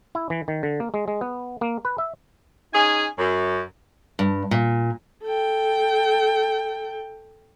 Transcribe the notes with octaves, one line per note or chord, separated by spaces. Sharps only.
E4
E3
D#3
D3
A#3
G#3
G#3
B3
A#3
B4
E5
C#4 D#4 G#4 G#5
F#2
G2
A#2
A4 G5